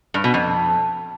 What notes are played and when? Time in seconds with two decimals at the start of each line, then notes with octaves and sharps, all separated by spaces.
0.14 G2
0.24 B2
0.34 F2